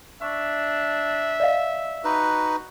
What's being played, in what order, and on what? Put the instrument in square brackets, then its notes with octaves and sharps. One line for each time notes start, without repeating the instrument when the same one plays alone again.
[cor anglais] D4 [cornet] E5 [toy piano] C#6
[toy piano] D5 D#5 F5
[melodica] D#4 B4 [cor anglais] F#4